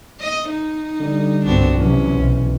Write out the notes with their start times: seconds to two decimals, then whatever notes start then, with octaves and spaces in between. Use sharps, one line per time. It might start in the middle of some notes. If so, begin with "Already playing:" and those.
0.20 D#5
0.49 D#4
1.00 D3 G3
1.45 C2 G2 B3 C4 D4 F#4
1.78 C3 E3 F#3 C#4
2.14 B1